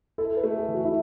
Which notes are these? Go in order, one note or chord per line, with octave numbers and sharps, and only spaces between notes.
E4 A4
B4
A3
G#4
E3
F#4
E4